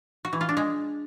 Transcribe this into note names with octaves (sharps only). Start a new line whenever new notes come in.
F#4
E3
F4
D4
G#3